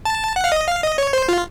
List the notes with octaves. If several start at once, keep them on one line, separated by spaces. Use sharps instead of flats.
A5
F#5
F5
D#5
F5
D#5
C#5
C5
F4